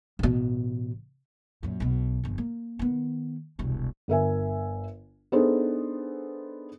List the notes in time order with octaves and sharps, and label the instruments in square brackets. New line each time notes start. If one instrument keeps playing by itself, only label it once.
[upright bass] A1 B2
F#2 A#2
B1 B2
G1 F2
A#3
D#3 B3
E1 C2
[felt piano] G1 A#4 E5 G#5
B3 D4 D#4 G#4 A4 C5